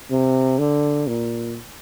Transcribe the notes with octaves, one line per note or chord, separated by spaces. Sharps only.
C3
D3
A#2